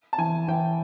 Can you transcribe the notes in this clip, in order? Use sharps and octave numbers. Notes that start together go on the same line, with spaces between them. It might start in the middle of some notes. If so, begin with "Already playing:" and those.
A5
E3 G#5
E3 G5